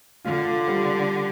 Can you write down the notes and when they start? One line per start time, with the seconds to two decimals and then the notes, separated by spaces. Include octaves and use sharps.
0.25 D3 F4
0.68 G3